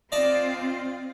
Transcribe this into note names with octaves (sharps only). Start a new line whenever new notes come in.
C4 F4 D5 D#5 A5